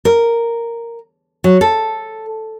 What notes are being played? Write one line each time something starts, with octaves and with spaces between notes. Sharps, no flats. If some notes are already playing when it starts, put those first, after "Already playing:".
A#4
F#3
A4